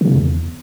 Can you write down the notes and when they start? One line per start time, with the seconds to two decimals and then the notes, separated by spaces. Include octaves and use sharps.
0.01 D3
0.07 C#3
0.14 E2